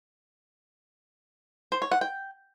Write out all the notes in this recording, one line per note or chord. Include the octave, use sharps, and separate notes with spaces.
C5
C#5
F#5
G5